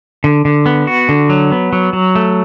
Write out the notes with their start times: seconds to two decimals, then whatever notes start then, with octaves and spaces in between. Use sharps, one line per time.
0.24 D3
0.45 D3
0.66 B3
0.87 F#4
1.09 D3
1.30 F#3
1.52 B3
1.73 F#3
1.93 F#3
2.15 A3